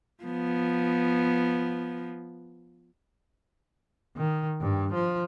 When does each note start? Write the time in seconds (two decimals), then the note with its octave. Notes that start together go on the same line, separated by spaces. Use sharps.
0.24 F3 B3
4.17 D#3
4.61 G2
4.94 F3